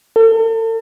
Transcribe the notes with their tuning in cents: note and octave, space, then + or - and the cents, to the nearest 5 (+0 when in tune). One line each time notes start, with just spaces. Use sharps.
A4 +40